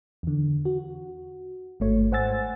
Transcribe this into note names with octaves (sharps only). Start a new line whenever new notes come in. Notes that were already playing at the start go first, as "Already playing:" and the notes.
E2 D3
F#4
G#1 G2 A3 C#5
G#2 C5 F#5 G#5 E6 A6